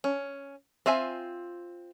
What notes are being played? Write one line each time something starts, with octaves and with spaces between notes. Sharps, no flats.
C#4
C4 F4 E5 G#5